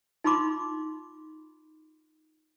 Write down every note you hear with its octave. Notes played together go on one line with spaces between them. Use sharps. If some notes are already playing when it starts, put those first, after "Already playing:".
D#4 F4 B5 C6 D6